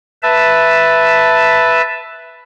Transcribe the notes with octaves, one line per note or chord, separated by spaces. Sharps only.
B4 E5 A5